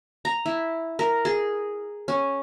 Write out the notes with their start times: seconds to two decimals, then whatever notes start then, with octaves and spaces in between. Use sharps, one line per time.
0.25 A#5
0.46 E4
0.99 A#4
1.25 G#4
2.08 C#4